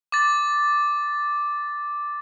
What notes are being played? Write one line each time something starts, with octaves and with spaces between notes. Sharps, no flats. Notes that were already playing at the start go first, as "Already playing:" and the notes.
D6 A6